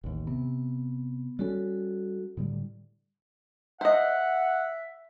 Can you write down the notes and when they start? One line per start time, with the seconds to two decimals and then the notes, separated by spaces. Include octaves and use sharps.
0.04 A1 D#2
0.27 C3 B3
1.39 G3 C#4 F#4 A4
2.37 A2 D3 G3
3.81 C5 D#5 E5 F#5